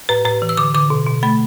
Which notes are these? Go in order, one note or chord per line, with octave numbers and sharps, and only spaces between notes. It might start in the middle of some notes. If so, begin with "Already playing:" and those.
A2 B4
A2 B4
E3
E6
D3 D6
D3 D6
B2
B2
A3 B5